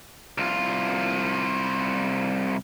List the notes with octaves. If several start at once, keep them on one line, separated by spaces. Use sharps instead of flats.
C2 F4